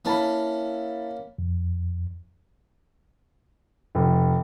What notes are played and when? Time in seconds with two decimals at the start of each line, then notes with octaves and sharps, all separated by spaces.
0.05 A#3 C#4 E4 A5 B5
1.39 F2
3.95 F1